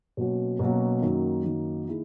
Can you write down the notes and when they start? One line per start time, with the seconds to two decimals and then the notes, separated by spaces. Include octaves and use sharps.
0.17 B2 F#3 A#3 C#4 F#4
0.59 B2 F#3 A#3 C#4 F#4
1.02 F#2 D#3 F#3 A#3
1.44 F#2 D#3 F#3 A#3
1.86 D#3 A#3 E4 G#4